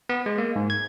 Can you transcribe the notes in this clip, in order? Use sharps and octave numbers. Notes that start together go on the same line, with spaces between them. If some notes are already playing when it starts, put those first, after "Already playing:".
B3
G#3
A#3
G#2
G#6